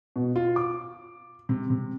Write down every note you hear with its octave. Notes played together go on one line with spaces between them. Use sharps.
B2
F4
D6
C3
C3